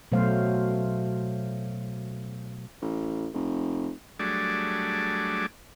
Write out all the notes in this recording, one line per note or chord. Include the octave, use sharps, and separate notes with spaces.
B2 F#3 A3 C5 F5
A1
F1
F#3 G3 A3 D4 G#4 D5